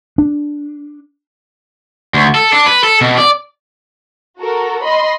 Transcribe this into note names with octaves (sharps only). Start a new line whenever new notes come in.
D4
D2
A4
D4
B4
A4
B2
D5
F#4 A4 A#4
D#5 B5 C6